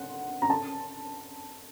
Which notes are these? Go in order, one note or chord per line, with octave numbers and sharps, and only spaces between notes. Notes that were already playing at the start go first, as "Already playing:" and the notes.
Already playing: F#5
A#5
A5